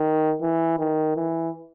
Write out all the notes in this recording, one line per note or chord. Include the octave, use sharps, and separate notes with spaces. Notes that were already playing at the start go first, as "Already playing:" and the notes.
Already playing: D#3
E3
D#3
E3